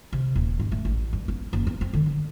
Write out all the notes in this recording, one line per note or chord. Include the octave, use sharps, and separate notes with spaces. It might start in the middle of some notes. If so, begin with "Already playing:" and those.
C3
D#1
G#2
A3
A1
G2
B3
F#1
B3
C4
D3
D3